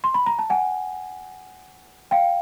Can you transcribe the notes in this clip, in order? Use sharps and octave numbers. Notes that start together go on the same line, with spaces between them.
C6
B5
A#5
A5
F#5 G#5
F5 G5